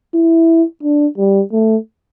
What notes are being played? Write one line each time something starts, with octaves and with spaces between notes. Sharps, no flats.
E4
D4
G3
A3